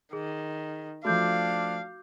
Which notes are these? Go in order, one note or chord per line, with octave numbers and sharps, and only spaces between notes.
D#3 G#4
F3 A3 D4 F#4 F5 D6 G6